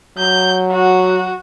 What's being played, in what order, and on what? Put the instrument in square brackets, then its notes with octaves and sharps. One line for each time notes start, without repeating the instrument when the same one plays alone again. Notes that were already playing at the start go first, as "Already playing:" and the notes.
[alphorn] F#3 [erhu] G6
[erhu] F#4